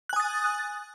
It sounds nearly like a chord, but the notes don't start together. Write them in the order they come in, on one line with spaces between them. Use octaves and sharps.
F#6 G#5 D#6 A6